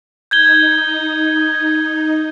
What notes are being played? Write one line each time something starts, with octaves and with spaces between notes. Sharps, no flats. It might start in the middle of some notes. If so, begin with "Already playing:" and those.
D#4 G6 G#6 G7